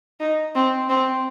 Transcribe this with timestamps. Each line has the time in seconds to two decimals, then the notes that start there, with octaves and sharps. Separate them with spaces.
0.20 D#4
0.55 C4
0.89 C4